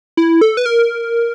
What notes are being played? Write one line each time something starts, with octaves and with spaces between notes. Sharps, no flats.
E4
A4
B4
A#4